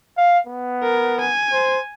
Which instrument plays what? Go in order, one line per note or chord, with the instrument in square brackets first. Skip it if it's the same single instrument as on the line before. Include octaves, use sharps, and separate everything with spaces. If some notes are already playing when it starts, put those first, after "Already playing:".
[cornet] F5
B3
[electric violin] A#4
G#5
[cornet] C5